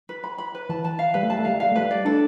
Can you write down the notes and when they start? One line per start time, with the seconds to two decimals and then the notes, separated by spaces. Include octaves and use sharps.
0.09 B4
0.24 B5
0.38 B5
0.55 B4
0.69 E3 A5
0.84 A5
0.99 F5
1.14 G3 B4
1.23 A3
1.30 G3 A5
1.39 A3
1.45 G3 F5
1.55 A3
1.60 G3 F5
1.72 A3
1.76 B4
1.81 G3
1.91 D5
2.05 D4 A4